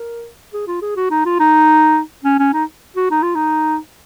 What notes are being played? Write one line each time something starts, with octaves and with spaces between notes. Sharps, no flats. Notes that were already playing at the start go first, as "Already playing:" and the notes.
Already playing: A#4
G#4
F4
G#4
F#4
D#4
F4
D#4
C#4
C#4
D#4
F#4
D#4
F4
D#4